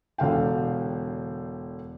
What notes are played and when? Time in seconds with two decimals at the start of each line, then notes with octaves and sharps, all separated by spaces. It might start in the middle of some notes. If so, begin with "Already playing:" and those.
0.18 E1 D3 F5 G5